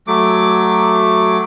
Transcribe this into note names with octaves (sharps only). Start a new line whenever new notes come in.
F#3 A3 D6